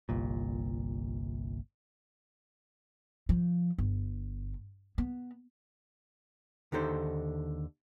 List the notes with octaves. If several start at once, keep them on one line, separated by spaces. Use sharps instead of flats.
G1 C2 A#2
F3
G1
B3
D#2 D3 D#4 A4 C5